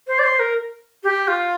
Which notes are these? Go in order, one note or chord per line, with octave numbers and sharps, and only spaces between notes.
C5
D5
C5
A#4
G4
F4